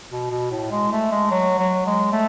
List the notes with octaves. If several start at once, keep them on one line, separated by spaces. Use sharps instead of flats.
B2
B2
A2
G#3
A3
G#3
F#3
F#3
G#3
A3